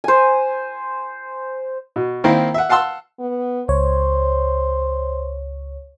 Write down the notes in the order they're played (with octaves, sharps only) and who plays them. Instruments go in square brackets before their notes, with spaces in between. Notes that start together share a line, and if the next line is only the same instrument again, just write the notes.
[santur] C5 G#5
[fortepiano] B2
D#3 A#3 C4 E4
E5 F#5
F5 F#5 A5 C6 E6
[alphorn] B3
[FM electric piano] C#2 C#5 [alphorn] C5